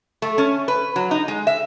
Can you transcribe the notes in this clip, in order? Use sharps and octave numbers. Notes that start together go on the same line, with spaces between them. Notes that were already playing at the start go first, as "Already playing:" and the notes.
A3
C#4
B4
F#3
D#4
G#3
E5